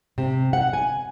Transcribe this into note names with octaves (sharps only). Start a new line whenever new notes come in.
C3
F#5
G#5